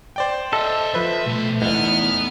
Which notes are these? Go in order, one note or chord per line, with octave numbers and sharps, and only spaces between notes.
C5 D5 G5
A4 D#5 E5
F3 B4 C5 E5
B2 A3 E5
E2 G#2 B3 D#4 F6